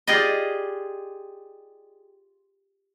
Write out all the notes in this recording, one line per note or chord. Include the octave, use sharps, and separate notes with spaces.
F4 G4 G#4 D5 D#5